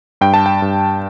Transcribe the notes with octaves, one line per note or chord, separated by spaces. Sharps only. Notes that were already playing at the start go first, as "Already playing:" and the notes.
G2 G5
A5
G5
G2